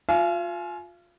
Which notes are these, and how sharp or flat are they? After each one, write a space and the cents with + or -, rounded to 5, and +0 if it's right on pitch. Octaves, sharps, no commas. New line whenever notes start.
F4 +20 F5 -40 G#5 +30